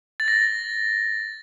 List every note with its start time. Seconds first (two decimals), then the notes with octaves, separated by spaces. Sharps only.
0.20 A6
0.28 A#6